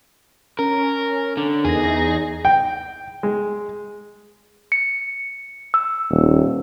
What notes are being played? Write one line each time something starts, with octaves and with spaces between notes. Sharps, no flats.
C#4 A#4
D3
E2 D#4 G#4 A#6
G5
G#3
C#7
E6
D#1